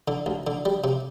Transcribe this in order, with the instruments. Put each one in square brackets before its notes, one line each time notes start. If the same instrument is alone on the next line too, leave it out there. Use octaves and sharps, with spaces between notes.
[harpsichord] D3
D2
D3
G3
C3